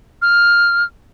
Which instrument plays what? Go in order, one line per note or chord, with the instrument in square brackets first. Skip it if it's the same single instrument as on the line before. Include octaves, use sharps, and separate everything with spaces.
[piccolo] F6